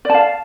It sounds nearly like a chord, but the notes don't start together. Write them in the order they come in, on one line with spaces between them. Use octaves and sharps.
D5 A5 F5